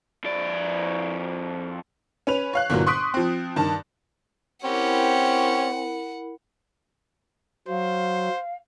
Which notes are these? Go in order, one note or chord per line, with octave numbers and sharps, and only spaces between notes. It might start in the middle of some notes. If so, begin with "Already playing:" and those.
F2 D5
C#4 B4 F7
C#5 F5 F#6
G1 A#2 E3 F#3
C6 C#6 D#6 F#6 B6 D7
F3 C4
G2 D#3 A5
C4 C#4 E4 G4 A#4 F#5 B5 C#6
F#3 C5 F5